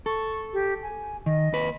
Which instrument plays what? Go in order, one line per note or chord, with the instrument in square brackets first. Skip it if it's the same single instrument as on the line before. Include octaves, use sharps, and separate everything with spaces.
[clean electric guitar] A4 [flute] C#6
[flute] G4
G#5
[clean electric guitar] D#3 [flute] D#5
[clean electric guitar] D#2 B4